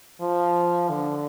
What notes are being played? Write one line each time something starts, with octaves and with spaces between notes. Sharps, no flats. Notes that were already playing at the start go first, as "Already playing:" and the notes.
F3
D3